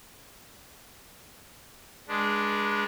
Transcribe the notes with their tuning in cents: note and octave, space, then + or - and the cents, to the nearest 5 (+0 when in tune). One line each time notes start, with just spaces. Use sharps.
G#3 +0 D4 +0 B4 -35